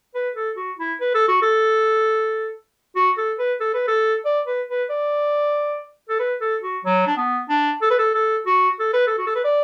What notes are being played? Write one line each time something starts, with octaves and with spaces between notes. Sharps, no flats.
B4
A4
F#4
E4
B4
A4
F#4
A4
F#4
A4
B4
A4
B4
A4
D5
B4
B4
D5
A4
B4
A4
F#4
F#3
D4
B3
D4
A4
B4
A4
A4
F#4
A4
B4
A4
F#4
A4
B4
D5